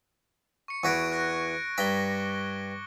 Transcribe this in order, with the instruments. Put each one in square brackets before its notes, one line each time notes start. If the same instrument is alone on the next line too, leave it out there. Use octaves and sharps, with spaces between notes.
[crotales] C#6 C#7
[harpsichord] E2 F#4 B4 [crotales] C#6 G#6 D7
[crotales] F#6 A#6
[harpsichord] G2 A#5 B5 [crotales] D6 G7